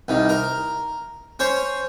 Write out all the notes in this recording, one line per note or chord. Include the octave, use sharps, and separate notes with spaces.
C2 D#3
A#4
C#4 C5 C#5 C6